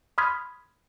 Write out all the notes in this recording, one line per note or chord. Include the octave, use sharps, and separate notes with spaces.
B5 C6 D#6 F6 G#6 B6